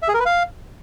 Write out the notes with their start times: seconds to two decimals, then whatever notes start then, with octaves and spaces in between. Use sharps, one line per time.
0.02 E5
0.08 G#4
0.14 A#4
0.20 B4
0.26 F5